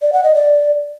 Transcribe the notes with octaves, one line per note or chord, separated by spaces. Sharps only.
D5
F#5
D#5
D5